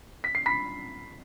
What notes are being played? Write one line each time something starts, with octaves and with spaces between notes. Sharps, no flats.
B6
C7
B5 B6